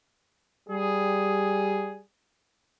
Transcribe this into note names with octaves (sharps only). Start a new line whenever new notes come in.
G3 G#4